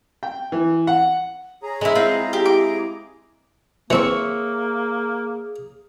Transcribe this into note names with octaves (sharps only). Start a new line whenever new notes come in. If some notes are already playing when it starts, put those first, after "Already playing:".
G5
E3
F#5
G#4 C#5 A#5
G#3 E4
C4 E4 F4
G4
E4 D6
E3 A#3 C4 G#4 C#5 E5 C#6